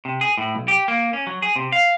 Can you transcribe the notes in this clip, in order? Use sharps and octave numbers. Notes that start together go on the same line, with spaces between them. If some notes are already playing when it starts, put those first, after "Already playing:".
C3
G#4
A2
B1
G4
A#3
C#4
F#3
G#4
C3
F5